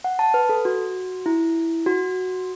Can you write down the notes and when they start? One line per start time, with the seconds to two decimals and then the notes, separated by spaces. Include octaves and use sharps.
0.04 F#5
0.19 A5
0.34 B4
0.49 A4
0.65 F#4
1.26 E4
1.86 F#4